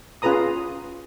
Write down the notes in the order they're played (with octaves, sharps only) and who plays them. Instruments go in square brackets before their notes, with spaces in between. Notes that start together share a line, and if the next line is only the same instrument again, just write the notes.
[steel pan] C#4 F4 G#4 B4 A#5 D#6